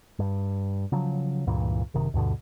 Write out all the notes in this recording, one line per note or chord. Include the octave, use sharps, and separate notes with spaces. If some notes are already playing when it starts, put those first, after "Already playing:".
G2
C#3 F3 F#3
C#2 G2 A#2 E3
F#1 C3 D#3
D2 G2 B2 D3